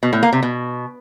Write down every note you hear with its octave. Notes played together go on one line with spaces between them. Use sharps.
B2
A2
A#3
C3
B2